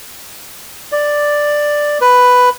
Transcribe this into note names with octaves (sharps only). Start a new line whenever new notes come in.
D5
B4